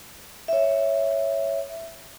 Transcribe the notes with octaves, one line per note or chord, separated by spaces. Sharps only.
C#5 E5